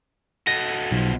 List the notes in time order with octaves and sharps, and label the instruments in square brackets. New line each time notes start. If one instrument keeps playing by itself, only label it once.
[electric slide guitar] F#4 A4 D#5 [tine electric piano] A#6
[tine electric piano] B1 [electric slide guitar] B2 F3